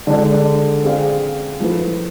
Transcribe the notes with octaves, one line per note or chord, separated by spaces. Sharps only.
D3 G#3 D4
C4 G#4 D5 F5
F3 A3 E4 B4